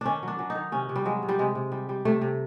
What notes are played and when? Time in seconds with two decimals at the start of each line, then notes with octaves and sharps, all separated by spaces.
0.01 D#3 C#4 D4
0.23 F#3 D4
0.39 F#3
0.50 D#4
0.55 D#3
0.72 C3 C#4
0.89 C3
0.96 G3
1.05 F#3 G#3
1.22 C3
1.29 G3
1.39 C3 G#3
1.55 C3
1.72 G3
1.89 G3
2.05 C3 A3
2.21 C3